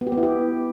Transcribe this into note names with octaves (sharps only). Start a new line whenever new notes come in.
B3
G4
B3
E4
G4